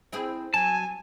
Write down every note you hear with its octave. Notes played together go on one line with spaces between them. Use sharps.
C4 E4 G#4
F#3 G#5 A5